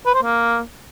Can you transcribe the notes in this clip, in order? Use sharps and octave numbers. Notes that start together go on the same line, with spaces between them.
B4
C5
A#3